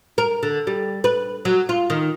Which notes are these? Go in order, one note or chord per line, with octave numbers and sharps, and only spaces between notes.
A#4
D3
G3
B4
F#3
F4
D#3